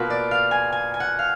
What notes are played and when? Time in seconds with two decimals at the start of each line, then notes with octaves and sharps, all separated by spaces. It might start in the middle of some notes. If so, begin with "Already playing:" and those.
Already playing: B2 A#3 F4 B4
0.10 D5
0.31 F5
0.51 G#5
0.72 G#5
0.94 G#5
1.00 F#5
1.19 F5